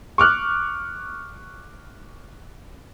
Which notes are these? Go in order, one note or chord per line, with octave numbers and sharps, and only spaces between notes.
C#6 D6 F6 F#6